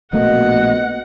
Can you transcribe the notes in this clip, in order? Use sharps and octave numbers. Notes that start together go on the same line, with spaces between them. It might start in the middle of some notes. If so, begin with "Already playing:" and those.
A#1 B2 A3 A#3 D#5 F#5